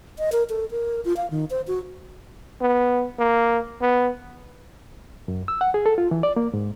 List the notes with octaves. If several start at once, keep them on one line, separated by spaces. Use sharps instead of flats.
D#5
A#4
A4
A#4
F4
F5
D#3
C5
F#4
B3
A#3
B3
F#2
E6
F#5
G#4
A4
F4
E3
D5
A#3
G#2